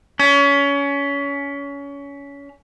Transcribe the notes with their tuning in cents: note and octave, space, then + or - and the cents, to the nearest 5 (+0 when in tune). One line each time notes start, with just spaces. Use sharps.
C#4 +25